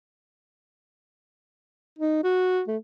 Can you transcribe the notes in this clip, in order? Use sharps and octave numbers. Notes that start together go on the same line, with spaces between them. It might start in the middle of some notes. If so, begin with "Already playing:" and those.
D#4
F#4
A3